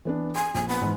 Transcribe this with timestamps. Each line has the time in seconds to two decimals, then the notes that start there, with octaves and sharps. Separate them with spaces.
0.05 E3 B3 D4
0.36 G#5 C6
0.54 A#1 G#5
0.68 B3
0.81 G#2 E3